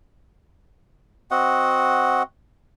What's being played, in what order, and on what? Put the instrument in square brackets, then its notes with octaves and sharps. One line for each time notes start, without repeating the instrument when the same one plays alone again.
[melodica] C4 F#4 D#5 F#5